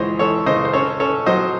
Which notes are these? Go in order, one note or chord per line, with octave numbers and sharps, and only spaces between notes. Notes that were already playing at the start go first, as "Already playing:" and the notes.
Already playing: C#2 E3 G#4 C5 C#5 D#5
E3 A4 C#5
C#3 C5 D#5
C5
C#4 A4 C#5
C#4 A4 C#5
F#3 C5 D#5